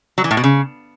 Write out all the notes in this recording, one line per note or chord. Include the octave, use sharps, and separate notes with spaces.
F#3
E3
A2
B2
C#3